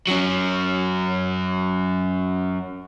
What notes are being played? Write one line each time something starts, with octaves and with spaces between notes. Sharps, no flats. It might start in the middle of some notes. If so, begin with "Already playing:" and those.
F#3 C#4